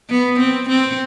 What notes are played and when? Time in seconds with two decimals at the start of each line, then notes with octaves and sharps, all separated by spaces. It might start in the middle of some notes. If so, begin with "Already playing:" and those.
0.10 B3
0.40 C4
0.70 C4